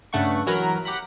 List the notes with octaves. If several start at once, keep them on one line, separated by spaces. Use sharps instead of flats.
G2 C#3 A3 F#5 C#6
E3 F#3 A#4 B4
G4 F#5 A#5 B5